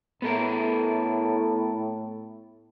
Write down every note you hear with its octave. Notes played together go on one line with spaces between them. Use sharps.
A2 B3 A4 A#4